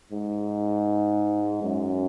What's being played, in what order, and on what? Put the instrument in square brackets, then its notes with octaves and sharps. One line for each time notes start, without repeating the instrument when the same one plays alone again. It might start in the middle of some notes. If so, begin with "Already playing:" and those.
[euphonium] G#2
F#2